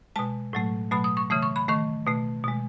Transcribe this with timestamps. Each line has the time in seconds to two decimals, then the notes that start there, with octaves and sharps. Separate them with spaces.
0.16 B2 G#3 A5
0.53 A2 F#3 A3
0.91 B2 F#3 A3 B5
1.04 D#6
1.17 C#6
1.30 C#3 E3 A3 D#6
1.42 C#6
1.56 B5
1.68 D#3 A3 C#6
2.06 B2 A3
2.44 B2 G#3